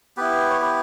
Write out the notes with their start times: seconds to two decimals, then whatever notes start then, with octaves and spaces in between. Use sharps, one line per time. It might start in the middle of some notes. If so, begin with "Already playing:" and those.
0.17 B3 E4 G4 B4
0.50 C#5
0.61 G4 B4